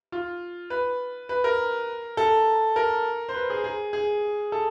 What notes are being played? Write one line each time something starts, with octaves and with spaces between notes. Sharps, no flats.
F4
B4
B4
A#4
A4
A#4
C5
B4
G#4
G#4
G#4
A4